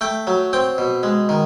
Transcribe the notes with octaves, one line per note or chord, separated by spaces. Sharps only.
A3 G5
F#3
C4 G5
B2
G#3
D#3